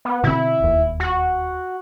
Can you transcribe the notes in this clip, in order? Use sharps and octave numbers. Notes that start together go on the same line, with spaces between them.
B3
B2 D3 C4 E4
E1 D#2
F#4